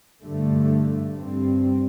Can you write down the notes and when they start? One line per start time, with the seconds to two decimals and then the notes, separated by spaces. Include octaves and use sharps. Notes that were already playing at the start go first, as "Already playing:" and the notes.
0.25 G2 D3 A3
1.16 G2 G3 C4